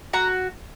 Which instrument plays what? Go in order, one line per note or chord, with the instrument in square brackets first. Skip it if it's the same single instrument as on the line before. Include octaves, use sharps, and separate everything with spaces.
[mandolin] F#4 A#5